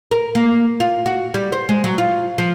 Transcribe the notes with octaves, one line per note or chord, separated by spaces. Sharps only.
A#4
A#3
F4
F#4
G3
C5
G#3
F#3
F4
F3